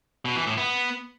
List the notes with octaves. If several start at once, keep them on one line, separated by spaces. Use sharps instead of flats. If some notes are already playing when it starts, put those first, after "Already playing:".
B2
E3
A2
B3